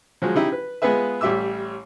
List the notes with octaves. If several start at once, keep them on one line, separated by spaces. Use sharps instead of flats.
F3 F#3 G#3
C#3 D#4 E4 G4
B4
G#3 B3 F4 G#4 B4 E5
A1 G3 G4 E5 D6 E6